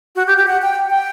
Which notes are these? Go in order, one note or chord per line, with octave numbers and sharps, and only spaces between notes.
F#4
G4
G4
F#5
G5
G5